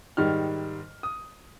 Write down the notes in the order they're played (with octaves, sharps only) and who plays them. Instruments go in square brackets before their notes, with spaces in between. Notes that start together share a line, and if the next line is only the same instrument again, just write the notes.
[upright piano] G#2 D#3 G3 F6
D#6